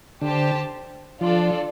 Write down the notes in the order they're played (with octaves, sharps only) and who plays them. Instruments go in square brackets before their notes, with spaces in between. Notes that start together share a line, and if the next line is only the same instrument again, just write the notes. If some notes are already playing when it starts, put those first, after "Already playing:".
[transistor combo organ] D3 [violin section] G4 C5 A5
[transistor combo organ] F3 [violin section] D4 F4 A4 D5